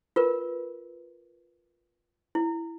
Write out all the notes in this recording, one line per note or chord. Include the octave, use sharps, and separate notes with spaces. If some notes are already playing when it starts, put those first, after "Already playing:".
F4 A#4 B4
E4